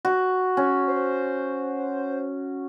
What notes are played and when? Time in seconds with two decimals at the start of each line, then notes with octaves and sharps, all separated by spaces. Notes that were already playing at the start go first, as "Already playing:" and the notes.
0.05 F#4
0.57 C#4
0.88 C5